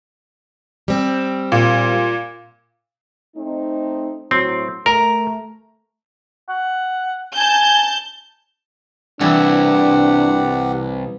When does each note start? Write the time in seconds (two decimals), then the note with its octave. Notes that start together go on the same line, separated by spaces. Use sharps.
0.88 G3 C4
1.52 A#2
3.36 A3 C4 D#4
4.31 A2 F#3 C4 C6
4.86 A3 A#4 A#5
6.49 F#5
7.36 G#5 A5 G6
9.21 C2 E3 D4 E4 G4 F#5